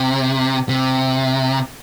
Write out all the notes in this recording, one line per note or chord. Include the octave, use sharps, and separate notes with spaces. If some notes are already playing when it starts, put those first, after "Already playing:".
Already playing: C3
C3